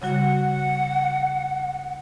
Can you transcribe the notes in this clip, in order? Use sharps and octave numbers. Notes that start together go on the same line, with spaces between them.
C#3 G3 F#4 F#5